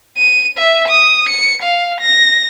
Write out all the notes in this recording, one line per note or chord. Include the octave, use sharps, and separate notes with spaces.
D#7
E5
D#6
C#7
F5
A#6